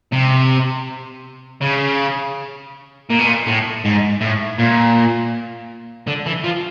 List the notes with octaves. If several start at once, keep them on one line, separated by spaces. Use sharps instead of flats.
C3
C#3
A#2
B2
A#2
A2
G#2
A2
A#2
D3
E3
F3